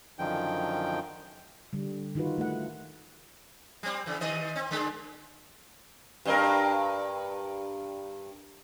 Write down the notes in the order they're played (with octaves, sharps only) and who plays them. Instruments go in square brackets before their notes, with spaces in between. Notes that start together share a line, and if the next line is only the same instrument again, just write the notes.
[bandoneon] F#2 D3 D#3 F3 G5
[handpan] D3 G3
D#3 D#4 F4 F#4 B4
A3 F#5
[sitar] G3 C4
C#3 E3
C3 D#3 D#5
C4
D3 G#3 D4
G2 D4 A#4